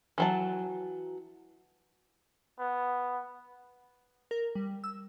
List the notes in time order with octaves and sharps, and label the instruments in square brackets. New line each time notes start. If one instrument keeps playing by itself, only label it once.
[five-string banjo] E3 F#3 A5
[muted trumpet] B3
[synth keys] A#4
G3
E6